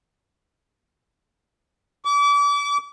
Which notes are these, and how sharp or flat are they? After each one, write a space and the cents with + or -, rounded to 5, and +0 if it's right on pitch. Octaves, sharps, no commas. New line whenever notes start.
D6 -35